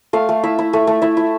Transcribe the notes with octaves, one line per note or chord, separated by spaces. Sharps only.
A3 F5
A3
E4 E5
E4
A3
A3
E4 E5
E4